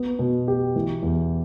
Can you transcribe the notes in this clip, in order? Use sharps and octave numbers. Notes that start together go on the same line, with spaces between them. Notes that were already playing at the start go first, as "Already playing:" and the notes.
Already playing: B3
B2
G4
E3
E2